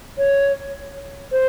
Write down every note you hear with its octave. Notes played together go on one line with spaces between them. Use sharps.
C#5
C5